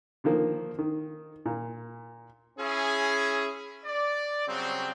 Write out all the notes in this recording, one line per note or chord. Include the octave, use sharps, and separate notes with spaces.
D3 D#3 F3 A#3
D#3
A#2
C#4 E4 G#4
D5
C#3 F#3 G3 C4